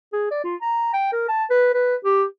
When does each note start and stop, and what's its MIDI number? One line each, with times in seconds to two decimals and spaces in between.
0.13 0.27 68
0.31 0.44 74
0.44 0.56 65
0.62 0.91 82
0.94 1.10 79
1.12 1.25 70
1.29 1.44 81
1.50 1.69 71
1.74 1.96 71
2.05 2.25 67